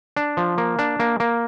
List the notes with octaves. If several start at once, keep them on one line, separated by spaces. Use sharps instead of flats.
D4
F3
A#3
D4
A#3
A#3